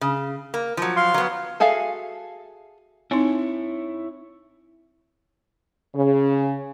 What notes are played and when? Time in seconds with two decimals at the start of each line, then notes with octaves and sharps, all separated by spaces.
0.01 C#3
0.54 A#3
0.77 F3 F#3
0.97 F5 C6
1.14 F#3 B3
1.60 F#4 G#4 A4 E5 F5
3.11 C4 D#4 E4 C#5
5.95 C#3